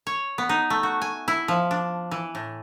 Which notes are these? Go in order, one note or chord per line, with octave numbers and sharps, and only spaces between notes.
C#5
B3
D#4
A3
F#4
G#5
E4
F3
D4
E3
A2